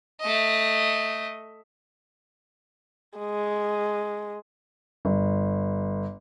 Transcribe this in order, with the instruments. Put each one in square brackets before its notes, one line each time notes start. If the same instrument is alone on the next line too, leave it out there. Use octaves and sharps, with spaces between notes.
[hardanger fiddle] A3 D#5
[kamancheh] G#3
[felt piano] G1